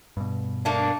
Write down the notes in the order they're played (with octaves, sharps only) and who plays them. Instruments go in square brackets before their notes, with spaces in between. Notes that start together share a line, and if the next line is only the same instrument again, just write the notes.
[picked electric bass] G2 B2
[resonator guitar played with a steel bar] A3 A#3 D4